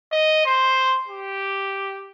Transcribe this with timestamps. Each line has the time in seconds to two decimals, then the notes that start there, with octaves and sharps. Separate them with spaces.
0.12 D#5
0.46 C5
1.08 G4